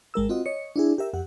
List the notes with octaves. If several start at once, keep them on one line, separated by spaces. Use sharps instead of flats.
G#1 G#3 A#4 E6
C4 F4 F#4 D#5
C#5 D#5 C#7
D4 E4 G#4
G4 A#4 E5
F2 G4 F#5